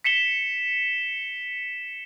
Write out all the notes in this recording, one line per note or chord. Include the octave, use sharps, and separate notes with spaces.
B6 C#7 E7 G7